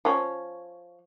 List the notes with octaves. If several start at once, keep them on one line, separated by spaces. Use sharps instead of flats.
F3 C#4